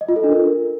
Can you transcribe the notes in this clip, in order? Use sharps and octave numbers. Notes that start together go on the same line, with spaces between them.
D#5
F4
A4
D4
A#4